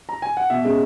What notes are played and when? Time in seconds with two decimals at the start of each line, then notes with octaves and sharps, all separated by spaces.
0.09 A#5
0.22 G#5
0.37 F#5
0.50 B2 E5
0.65 G#3 C#4